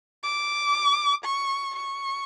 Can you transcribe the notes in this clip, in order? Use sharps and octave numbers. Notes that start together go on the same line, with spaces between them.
D6
C#6
C#6